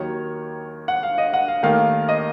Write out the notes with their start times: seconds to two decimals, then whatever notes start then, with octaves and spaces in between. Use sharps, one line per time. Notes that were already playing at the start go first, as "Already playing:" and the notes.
Already playing: D#2 D#3 F#3 C#5
0.88 F#5
1.03 F5
1.18 D#5
1.33 F#5
1.48 F5
1.63 D#2 D#3 A3 F5
2.09 D#5